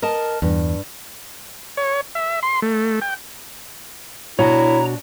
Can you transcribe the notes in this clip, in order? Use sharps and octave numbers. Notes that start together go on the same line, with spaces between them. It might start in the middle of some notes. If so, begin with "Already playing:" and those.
A#4 D#5 A5
E2 G2
C#5
E5
C6
A3
G5
B2 D4 E4 F#4 C#5 A#5